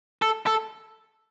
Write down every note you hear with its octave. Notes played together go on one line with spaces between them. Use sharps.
A4
A4